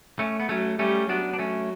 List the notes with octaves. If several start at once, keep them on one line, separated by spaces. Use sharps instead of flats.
A3 C#4
B3
F#3 A3 C#4
G3 A3 C#4
F#3 B3 D4
D4
A3 C#4